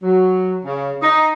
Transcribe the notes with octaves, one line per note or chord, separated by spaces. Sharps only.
F#3
C#3
D#4